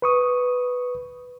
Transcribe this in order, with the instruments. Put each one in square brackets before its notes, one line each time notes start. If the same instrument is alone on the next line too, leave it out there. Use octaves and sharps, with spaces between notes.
[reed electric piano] B4 C#6 D#6